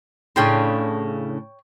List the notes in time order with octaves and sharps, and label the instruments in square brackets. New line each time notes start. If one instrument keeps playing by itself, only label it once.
[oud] A2 C#3 D4 [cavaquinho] C#5 G5 C6